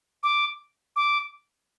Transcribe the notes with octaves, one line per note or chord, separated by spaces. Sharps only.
D6
D6